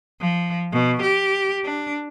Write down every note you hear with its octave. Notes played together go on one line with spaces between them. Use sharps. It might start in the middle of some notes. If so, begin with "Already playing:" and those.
F3
B2
G4
D4